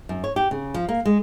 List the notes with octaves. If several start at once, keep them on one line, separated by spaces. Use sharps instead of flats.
F#2
C#5
G4
C#3
F3
A#3
G#3